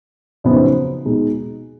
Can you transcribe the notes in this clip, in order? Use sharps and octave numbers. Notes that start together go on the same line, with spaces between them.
F#2 C#3 F3 B3 D#4
B2 G#3 D#4